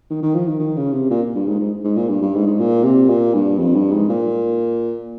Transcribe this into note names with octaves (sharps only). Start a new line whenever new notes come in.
D#3
D#3
F3
D#3
D#3
C#3
C3
A#2
G2
G#2
G#2
G#2
A#2
G2
G2
G#2
G#2
A#2
C3
A#2
G2
F2
G2
G#2
A#2